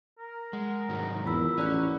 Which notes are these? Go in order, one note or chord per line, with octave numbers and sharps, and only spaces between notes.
A#4
G#3 F#5
G#2 D#3 F#3
E2 F4 A#4 B5 E6
A1 C#4 D5 F#5 A#5 F#6